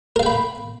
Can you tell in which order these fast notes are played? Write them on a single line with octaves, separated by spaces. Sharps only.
A#4 F5 G5 B5